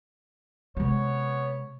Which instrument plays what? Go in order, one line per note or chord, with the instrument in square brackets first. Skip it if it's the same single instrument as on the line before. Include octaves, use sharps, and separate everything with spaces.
[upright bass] C3 G#3 [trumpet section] B3 C#5